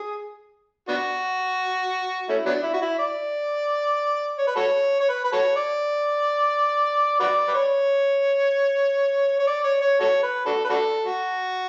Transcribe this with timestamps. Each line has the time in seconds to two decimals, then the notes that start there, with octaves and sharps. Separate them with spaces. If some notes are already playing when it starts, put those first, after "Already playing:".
Already playing: G#4
0.89 B3 D4 F#4
2.29 A3 C#4 E4
2.46 F#3 B3 D4
2.63 E4
2.74 F#4
2.82 E4
2.99 D5
4.39 C#5
4.47 B4
4.56 F#4 A4 C#5
5.00 C#5
5.09 B4
5.25 B4
5.33 F#4 A4 C#5
5.56 D5
7.20 F#4 B4 D5
7.48 B4
7.54 C#5
9.39 C#5
9.47 D5
9.64 C#5
9.82 C#5
10.00 F#4 A4 C#5
10.23 B4
10.46 D4 F#4 A4
10.65 B4
10.70 D4 F#4 A4
11.05 F#4